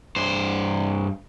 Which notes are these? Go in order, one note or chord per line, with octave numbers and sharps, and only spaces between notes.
G2 C5